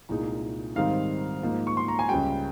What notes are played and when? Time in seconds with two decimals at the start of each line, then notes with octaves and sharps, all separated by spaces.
0.09 C2 A#2 G#3 D#4
0.76 G#2 D#3 G3 C4 D#4 F5
1.43 G#2 F3 A#3 D#4
1.67 C#6
1.77 C6
1.88 A#5
1.99 G#5
2.09 C#2 C#3 G3 G5